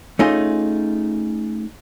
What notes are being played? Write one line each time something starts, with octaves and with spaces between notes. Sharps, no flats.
A3 C#4 D#4 F4 G#4